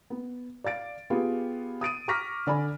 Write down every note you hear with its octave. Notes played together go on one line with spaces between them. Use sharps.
B3
D5 F5 A6 D7
B3 F4 G4 G#4
D#6 A6 D7 D#7
A#5 C#6 D6 F6 A#6 B6
D3 D5 G#5 B5